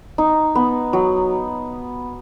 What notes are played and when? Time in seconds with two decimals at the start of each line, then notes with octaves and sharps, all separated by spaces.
0.18 D#4
0.55 B3
0.93 F#3